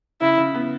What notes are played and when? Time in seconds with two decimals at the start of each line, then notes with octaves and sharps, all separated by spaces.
0.21 C#3 E4
0.38 C#3
0.55 B3